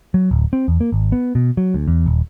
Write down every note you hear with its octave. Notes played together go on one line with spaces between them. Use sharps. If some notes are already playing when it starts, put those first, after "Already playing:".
F#3
D1
C4
E2
A#3
G#1
B3
B2
F#3
D2
E2
D#1